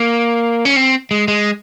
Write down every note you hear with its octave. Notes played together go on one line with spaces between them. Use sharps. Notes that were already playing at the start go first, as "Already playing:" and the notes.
Already playing: A#3
C#4
C4
G#3
G#3